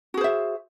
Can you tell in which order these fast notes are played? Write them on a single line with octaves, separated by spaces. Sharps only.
F#4 G#4 C5 E5